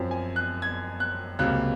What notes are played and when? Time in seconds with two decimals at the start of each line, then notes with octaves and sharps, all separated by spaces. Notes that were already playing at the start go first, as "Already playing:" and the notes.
Already playing: F#2 F3 C4
0.11 G#5
0.36 F#6
0.62 G#6
1.00 F#6
1.39 C#2 C3 F#3 A#3 F#6